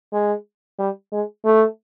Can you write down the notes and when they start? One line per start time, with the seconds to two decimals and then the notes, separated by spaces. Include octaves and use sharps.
0.13 G#3
0.79 G3
1.12 G#3
1.45 A3